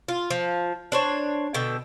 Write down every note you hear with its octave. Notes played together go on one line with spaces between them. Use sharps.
F4
F3
D4 C5 C#5
B2 D3 G5